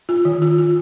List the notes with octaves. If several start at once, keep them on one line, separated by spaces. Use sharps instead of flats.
F4
D#3
F4
F4